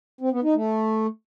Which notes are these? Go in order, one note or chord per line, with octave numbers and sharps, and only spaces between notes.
C4
B3
D#4
A3